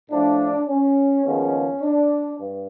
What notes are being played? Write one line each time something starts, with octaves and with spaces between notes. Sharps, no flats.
A2 F3 A3 D4
C#4
D#2 C#3 F3 G#3 B3 C#4
D4
G2